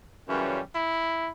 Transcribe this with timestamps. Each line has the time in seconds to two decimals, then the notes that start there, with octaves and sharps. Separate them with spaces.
0.29 F#2 C#3 E3 G3 C#4
0.75 E4